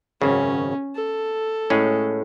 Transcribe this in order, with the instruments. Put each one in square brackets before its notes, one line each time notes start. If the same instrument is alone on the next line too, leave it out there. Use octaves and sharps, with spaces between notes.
[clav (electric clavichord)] G#1 F#2 C#3 [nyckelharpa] C#4
[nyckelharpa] A4
[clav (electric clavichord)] A2 G#3 C#4 G#4